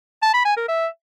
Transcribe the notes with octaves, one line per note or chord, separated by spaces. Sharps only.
A5
B5
G#5
A#4
E5